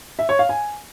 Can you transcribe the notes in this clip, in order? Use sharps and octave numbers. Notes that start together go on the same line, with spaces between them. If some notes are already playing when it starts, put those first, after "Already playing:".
E5
C#5
F5
G#5